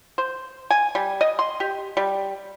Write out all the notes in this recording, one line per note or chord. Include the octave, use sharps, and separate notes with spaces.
C5
G#5
G3
D#5
C6
G4
G3